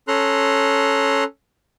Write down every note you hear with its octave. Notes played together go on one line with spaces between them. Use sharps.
C#4 A4 A#5 C6 F#6